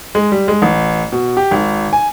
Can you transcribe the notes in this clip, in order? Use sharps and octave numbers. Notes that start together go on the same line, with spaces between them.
G#3
G3
G#3
A1
B2
G4
G#1
G#5